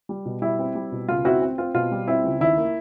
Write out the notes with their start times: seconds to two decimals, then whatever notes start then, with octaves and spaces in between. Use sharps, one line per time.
0.09 G3
0.25 B2
0.42 G3 E4
0.59 C4
0.75 G3
0.92 B2
1.08 C#2 F4
1.25 C4 E4 F#4
1.42 C4
1.58 C4 F4
1.74 B2 F4
1.92 G3
2.08 C4 E4
2.24 C#2
2.40 D#2 E4
2.57 A#3